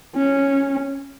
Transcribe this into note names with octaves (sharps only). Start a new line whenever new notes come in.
C#4